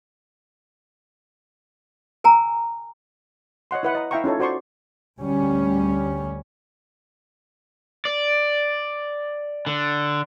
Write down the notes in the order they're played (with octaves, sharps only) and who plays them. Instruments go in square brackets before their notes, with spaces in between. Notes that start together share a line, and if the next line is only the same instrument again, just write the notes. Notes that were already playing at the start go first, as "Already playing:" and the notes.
[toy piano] A#4 G#5 A#5
[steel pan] C#5 D#5 F#5 C6
E4 B4 F#5
D#5 A#5
E4 E5 F5 G5 A#5 C#6
C#4 D#4 F4 A4 C#5
F#4 C5 D5 C6 C#6
[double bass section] D2 G3 C#4
[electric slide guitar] D5
D3